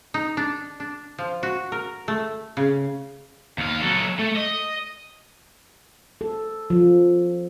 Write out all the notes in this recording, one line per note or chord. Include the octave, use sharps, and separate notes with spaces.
D#4
D4
D4
F3
F#4
A#4
A3
C#3
D#2 F5
F#3 A4
A3
D#5
A4
F3